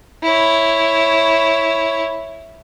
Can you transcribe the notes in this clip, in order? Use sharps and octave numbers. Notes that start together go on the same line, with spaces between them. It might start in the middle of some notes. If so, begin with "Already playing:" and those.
E4 C#5